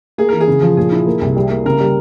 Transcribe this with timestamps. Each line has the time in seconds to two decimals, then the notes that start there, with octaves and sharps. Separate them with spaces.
0.18 A#3 G#4
0.29 E3 A#4
0.40 G#4
0.48 C#3
0.62 F3
0.77 A#2 G#4
0.92 E4
1.06 A#3
1.21 C2
1.36 G3
1.50 A#3
1.65 C#3 A#4
1.80 G3